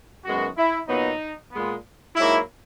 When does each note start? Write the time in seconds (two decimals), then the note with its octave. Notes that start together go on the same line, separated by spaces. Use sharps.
0.25 F#2 D#3 G#3 B3 F#4
0.56 E4
0.88 A#2 F#3 B3 D#4
1.52 A#2 G#3 B3
2.15 G#2 F#3 A#3 E4